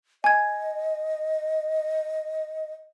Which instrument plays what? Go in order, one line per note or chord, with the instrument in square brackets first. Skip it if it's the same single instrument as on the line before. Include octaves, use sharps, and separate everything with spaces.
[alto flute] D#5 [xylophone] G#5 G#6